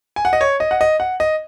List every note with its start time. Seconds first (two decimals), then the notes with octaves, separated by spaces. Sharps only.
0.16 G#5
0.25 F#5
0.33 D#5
0.41 C#5
0.60 D#5
0.71 F#5
0.81 D#5
1.00 F#5
1.20 D#5